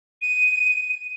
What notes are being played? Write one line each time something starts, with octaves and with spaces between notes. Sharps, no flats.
D#7